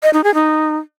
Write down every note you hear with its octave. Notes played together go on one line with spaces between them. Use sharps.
D#5
D#4
G#4
D#4